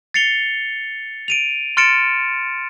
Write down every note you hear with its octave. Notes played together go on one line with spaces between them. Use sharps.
A6 C7 C#7 F7 G7
D7 D#7 F7
C6 F6 A6 C#7 D7 E7